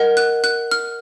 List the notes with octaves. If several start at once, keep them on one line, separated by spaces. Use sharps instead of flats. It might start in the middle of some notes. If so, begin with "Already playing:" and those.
Already playing: A#4 D#5 F#5
F#6
F#6
F6